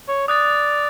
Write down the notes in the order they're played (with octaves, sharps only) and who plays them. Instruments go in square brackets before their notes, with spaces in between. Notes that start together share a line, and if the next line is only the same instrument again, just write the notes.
[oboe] C#5
[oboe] D5 [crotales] D#6 F#6 A6